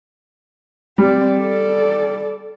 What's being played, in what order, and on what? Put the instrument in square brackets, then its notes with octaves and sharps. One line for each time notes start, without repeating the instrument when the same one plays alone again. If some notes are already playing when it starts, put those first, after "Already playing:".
[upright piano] G3 [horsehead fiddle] C4 D5
[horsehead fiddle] A4 D5